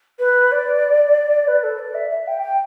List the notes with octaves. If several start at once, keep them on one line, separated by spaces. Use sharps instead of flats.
B4
D5
B4
A4
D5
E5
E5
G5
G5